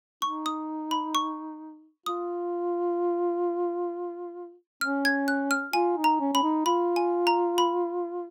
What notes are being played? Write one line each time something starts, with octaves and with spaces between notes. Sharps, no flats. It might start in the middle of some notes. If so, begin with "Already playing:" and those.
D#4 C#6
D#6
B5
C#6
F4 D#6
C#4 F6
G#6
F#6
F6
F4 G#5
D#4
A#5
C#4
C#4 B5
D#4
F4 B5
G#5
A#5
B5